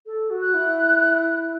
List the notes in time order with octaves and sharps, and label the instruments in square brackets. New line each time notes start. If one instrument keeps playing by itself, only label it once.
[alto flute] A4
F#4
[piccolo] F#6
[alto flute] E4